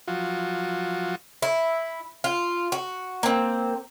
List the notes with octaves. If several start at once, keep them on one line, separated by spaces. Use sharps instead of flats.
F3 F#3 F4 F#4
E4
F4
F#4
A#3 C4